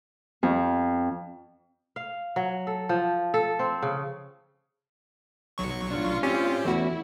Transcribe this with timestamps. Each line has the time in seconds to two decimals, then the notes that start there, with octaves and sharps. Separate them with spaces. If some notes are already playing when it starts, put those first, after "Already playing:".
0.43 F2
1.96 F5
2.36 F#3
2.67 A4
2.89 F3
3.34 A4
3.59 C4
3.82 C#3
5.58 B1 F#3 C#6
5.91 A2 D4 F4
6.23 C4 C#4 G4
6.65 E2 A3 C#4 E4 F#4